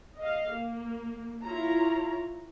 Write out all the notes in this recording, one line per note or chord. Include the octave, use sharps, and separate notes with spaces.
D#5 F5
A#3
E4 F4 C#5 A#5